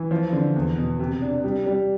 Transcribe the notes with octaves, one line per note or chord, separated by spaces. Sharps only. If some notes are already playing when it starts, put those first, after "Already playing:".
Already playing: E3
F3
D3
E2
B2
C3
D4
G3
G3